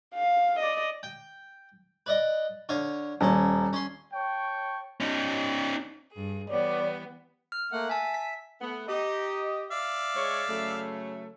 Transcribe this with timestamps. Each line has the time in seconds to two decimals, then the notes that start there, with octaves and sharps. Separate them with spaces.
0.14 F5
0.60 D5 D#5
1.03 G5
2.06 B4 D5 D#5
2.69 D3 C#5 F5
3.21 D#1 A#2 C#4
3.73 C#4 C6
4.13 C#5 G5 A5 C#6
5.00 C#4 D#4
6.13 G2 G#4
6.49 E3 G3 B3 C#5 D5
7.52 F6
7.72 A3 A#3 F#5
7.90 E5 G#5 A5
8.14 B6
8.61 A3 B3
8.88 D#4 G4 D#5
9.71 D5 E5 F5
10.16 G#3 C#5
10.49 C#3 F#3 A3